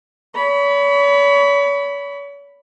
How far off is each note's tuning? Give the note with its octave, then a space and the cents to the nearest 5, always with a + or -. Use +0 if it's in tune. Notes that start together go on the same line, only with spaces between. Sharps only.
C#5 +40 B5 +0